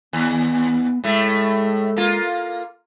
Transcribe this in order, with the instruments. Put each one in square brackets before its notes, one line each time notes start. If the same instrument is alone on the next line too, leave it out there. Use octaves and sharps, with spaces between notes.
[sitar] D#2 [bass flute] B3
[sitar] A2 A3 [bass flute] G#3
[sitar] A#3 F4